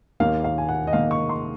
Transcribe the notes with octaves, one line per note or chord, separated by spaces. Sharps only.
D#2 D#3 A#3 F5
F5
G#5
F#5
D#5
D#2 D#3 A#3 F5
C#6
C6